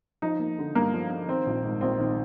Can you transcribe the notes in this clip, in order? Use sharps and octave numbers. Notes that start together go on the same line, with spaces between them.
F3 D#4
A#3
D3
G2 A#3
F3
A#3
D#3 C4
A#1
G#2
A#1 C4
D#3